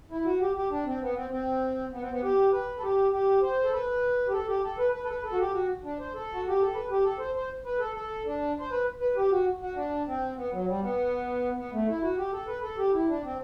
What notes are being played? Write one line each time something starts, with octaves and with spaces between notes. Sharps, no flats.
E4
F#4
G4
G4
D4
C4
B3
C4
C4
B3
C4
B3
G4
B4
A4
G4
G4
C5
A4
B4
G4
A4
G4
A4
B4
B4
A4
B4
A4
F#4
G4
F#4
D4
C5
A4
F#4
G4
A4
B4
G4
A4
C5
C5
B4
A4
A4
D4
C5
B4
B4
G4
F#4
F#4
D4
C4
B3
F#3
G3
B3
B3
A3
E4
F#4
G4
A4
B4
A4
G4
E4
D4
C4